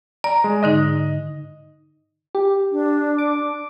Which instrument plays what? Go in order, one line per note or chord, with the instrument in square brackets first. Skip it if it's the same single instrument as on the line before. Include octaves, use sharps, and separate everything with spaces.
[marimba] D5 [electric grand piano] A#5
[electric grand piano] G#3
[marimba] G#2 D3 D#4 [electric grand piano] D#5
[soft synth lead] G4
[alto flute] D4
[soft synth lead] D6